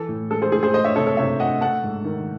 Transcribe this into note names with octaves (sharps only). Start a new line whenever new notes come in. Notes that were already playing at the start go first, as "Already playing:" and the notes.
Already playing: E3 A4
A2
G#3 A4
G#4 C5
A2 G#4
G#4 C5
A3 C5 D#5
C#5 E5
C3 A4 C#5
A4 C#5
C3 C#5 E5
A3 D#5 F#5
A3 F#5 A5
G#2
D#3